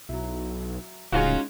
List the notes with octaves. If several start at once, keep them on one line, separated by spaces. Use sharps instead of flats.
B1 F#3 E4
D1 C#3 G#3 C#4 D#4 F4 F#4